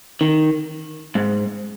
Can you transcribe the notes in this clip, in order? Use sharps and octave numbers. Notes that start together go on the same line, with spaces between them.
D#3
G#2